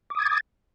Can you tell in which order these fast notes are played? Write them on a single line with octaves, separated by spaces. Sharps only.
D6 D#6 G#6 A6